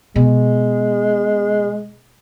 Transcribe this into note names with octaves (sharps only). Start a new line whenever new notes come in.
B2 G#3